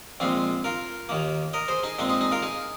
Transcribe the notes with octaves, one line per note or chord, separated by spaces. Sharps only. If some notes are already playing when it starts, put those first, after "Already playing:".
A#1 A#2 G#3 C4 F4
F4 A#4
D#2 D#3 A#3
A#4 D#5
G#4 C5
D#4 G#4
A#2 G#3 C4 D#4
D#4 G#4
D#4 G#4
F4 A#4
D#4 G#4